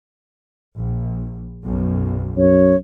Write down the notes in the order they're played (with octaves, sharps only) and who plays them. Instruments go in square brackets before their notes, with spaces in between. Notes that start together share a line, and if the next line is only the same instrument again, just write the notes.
[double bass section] A#1
B1 F#2
[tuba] F#2 [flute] C#5